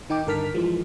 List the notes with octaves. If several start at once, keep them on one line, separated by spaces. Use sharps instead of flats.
D#3 D#4 G5 D6
G2 D3 A#4 A5 F6 B6
E3 F3 G#3